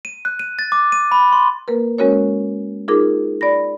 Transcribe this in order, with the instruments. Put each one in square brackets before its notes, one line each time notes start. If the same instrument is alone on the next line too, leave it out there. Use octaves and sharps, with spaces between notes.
[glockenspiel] D#7
F#6
D#7
A6
D6
D#7
B5
C6
[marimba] A#3 A#4 B4
G#3 C#4 F#4 A#4 C#5
D#4 F4 G#4 A#4 D6
D5 B5 A#6